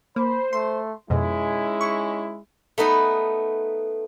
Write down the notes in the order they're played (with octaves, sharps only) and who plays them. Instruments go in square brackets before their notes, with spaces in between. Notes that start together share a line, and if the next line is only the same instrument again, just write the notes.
[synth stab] A#3 [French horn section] C5 [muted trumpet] B5
[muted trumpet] A3 [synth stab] C6
[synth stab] F2 B2 [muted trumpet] G#3 [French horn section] C#4 D#4 E4
[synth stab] C#6
[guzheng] A3 B3 D#4 B4